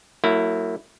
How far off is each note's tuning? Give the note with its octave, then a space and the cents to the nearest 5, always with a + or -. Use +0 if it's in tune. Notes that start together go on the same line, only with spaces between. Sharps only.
F#3 +0 A#3 -40 E4 +0